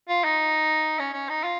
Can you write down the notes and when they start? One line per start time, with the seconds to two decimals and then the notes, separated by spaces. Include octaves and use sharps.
0.09 F4
0.25 D#4
0.99 C#4
1.14 C#4
1.30 D#4
1.44 F4